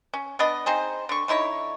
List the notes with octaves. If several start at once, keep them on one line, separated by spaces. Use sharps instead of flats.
C#4
B3 D4 B4 D#5
C4 D#4 G#4 C5
D3 C#6
D3 D#4 E4 C#5